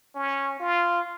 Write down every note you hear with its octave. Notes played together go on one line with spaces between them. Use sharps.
C#4
F4